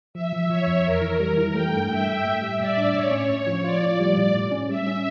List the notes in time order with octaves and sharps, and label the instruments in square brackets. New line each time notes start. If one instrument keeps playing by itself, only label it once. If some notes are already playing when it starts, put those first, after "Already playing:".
[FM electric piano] F3 [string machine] E5
[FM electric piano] F3
[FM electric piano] F3 [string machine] C#5
[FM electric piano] F2
[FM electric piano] E2 [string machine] A#4
[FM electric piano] E3
G3
E3
[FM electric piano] A3 [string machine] G5
[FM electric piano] G2
[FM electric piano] G2 [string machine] E5
[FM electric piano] G2
A2
G3
[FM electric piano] A2 [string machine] D5
[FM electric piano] D4
[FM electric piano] A2 [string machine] C#5
[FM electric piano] C#4
A2
F3
[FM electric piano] F4 [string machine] D5
[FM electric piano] A2
G3
A2
A2
C#4
[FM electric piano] G3 [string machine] E5
[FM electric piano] C#4